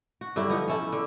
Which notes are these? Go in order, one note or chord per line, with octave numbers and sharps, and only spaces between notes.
F#4
G2 D3 F#3 E4
F3 B3 D#4
C#4 E4 A4
D3